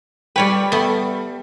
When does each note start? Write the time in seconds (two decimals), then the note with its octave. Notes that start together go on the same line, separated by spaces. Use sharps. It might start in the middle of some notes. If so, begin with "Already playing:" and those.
0.36 G3 B4 C#5 D5 G5
0.72 A3 B3